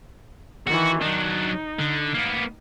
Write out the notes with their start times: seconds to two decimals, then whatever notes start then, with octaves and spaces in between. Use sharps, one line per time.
0.67 D#3 E3 F#4
1.02 F#3 D4 D#4
1.79 D3
2.15 A#3 B3